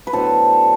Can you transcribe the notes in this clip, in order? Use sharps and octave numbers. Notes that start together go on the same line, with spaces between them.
B4
A2 F#3 B3 D4 A4 C5